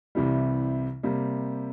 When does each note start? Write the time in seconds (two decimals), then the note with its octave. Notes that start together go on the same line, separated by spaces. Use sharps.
0.15 C2 C3 E3 G3
1.03 C3 G3 A#3